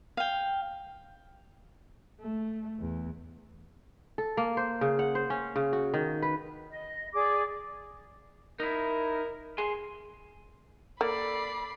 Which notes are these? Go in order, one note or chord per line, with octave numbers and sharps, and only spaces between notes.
F5 G5
A3
E2
A4
A#3
C5
C#3
F#5
C5
C#4
C#3
F#4
D#3
B4
D#5
G#4 D5 D6
D#4 E4 A#4
G#4 G#5 C6
A#3 A4 D5 B5 C7